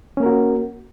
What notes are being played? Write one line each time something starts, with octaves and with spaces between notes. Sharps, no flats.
A#3 C#4 F#4 A#4